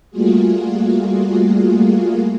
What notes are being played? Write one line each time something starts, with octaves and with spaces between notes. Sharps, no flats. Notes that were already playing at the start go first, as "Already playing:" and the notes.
G3 A3 A#3 F4 F#4 G#4